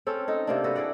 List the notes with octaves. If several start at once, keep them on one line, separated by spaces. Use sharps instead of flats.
C4 C#4 A4
D#4 A4
C3 A#3 D4
F#4 A4 B4
E4 G#4 D5 F#5